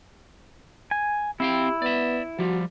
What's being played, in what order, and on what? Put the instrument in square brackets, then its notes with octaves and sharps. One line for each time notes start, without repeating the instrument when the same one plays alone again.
[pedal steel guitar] G#5
[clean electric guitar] C4 F5 G5 [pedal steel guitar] E4 [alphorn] G4
[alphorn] B3 [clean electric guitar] D5 E5
[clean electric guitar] F3 G3 [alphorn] F#4